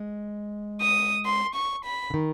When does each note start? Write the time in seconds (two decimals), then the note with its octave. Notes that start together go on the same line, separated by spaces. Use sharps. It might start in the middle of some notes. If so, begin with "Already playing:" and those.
Already playing: G#3
0.81 D#6
1.26 C6
1.55 C#6
1.85 B5
2.10 D3
2.14 D#3